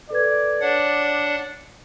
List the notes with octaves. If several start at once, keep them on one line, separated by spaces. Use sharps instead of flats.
A4 B4 D5 G#6
D4 C#5 F#5